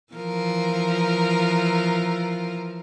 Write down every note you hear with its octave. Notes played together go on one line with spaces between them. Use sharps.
E3 F3 A#4